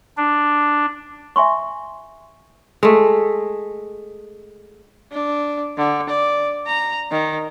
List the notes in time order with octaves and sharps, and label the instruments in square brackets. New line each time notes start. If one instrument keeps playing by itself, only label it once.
[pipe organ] D4
[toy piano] E5 G#5 C6 C#6
[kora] G#3 A3
[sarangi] D4
D3
D5
A#5
D#3